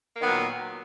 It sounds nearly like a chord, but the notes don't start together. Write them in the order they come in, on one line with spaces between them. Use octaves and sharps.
A#3 D#3 B3 F#3 A#2